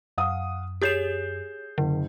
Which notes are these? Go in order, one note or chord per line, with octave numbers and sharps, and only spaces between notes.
F#2 F5 F#5 D#6
G4 G#4 C#5 G6 C7 E7
F#1 D3